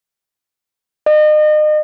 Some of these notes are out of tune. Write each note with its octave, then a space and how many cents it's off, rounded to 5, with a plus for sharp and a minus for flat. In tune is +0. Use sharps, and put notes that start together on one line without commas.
D#5 -35